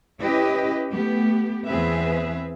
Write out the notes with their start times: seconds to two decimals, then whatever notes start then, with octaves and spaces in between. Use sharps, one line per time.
0.23 C#4 E4 G4 B4 D#5
0.93 A3 B3 G4
1.66 E2 B3 C4 G#4 B4 E5